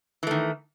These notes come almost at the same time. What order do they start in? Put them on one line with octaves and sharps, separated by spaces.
E3 A3 D#3